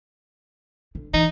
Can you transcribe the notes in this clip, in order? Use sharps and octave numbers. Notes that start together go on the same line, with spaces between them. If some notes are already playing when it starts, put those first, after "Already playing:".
D3
E3 D#4